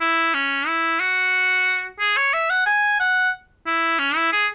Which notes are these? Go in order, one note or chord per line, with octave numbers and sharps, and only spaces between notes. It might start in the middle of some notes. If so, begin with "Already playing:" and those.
E4
C#4
E4
F#4
G#4
C#5
E5
F#5
G#5
F#5
E4
C#4
E4
G#4